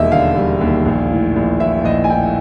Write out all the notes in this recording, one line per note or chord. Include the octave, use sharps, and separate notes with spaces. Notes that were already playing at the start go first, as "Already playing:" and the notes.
Already playing: E1 D#2 G3 D#5 E5
D3 F5
G3
D#2
A#1
A2
A#1
E3 E5
A#1 D#5
G#5
A2 G5